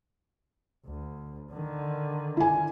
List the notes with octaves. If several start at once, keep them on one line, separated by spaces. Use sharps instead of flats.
D2
D3 D#3
E4 G#5